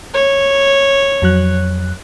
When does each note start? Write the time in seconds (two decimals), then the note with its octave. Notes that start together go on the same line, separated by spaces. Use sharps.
0.14 C#5
1.22 F2 F#3 F#6